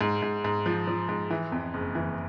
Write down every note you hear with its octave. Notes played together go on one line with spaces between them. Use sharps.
G#2
G#2
G#2
F3
F3
G#2
E3
F2
F#1
E3